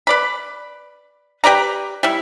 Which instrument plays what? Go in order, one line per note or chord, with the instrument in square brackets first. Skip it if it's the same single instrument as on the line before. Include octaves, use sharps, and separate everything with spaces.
[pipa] B4 D5 B5
G4 B4 D5 A#5
G3 E4